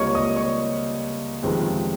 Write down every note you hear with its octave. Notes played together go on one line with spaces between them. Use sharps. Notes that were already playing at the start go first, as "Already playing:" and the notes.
Already playing: C#2 C3 G3 A#3 C#5 D#5 C#6
D#5 D#6
C#5 C#6
G1 F2 C3 D#3 G#3